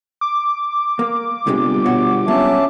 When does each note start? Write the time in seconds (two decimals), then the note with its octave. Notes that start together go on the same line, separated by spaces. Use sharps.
0.21 D6
0.99 A#3
1.47 G1 C3 G3 G#3
1.86 B2 F#4 C#5
2.28 F#3 A#3 C#4 E5 A5